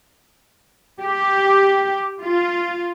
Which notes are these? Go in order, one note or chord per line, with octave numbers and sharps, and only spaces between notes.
G4
F4